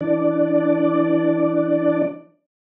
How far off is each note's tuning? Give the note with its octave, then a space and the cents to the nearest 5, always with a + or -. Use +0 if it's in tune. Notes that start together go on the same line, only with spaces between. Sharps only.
E3 +0 D4 +0 D5 +0